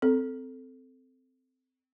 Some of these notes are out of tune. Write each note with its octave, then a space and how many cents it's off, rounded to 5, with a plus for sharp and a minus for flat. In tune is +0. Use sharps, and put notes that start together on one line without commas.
C4 -20 A4 +0